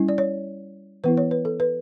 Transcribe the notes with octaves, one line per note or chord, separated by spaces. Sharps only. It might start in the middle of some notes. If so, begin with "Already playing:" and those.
Already playing: G3 C#4 E4
D5
C#5
E3 B3 E4 B4
C#5
B4
A4
B4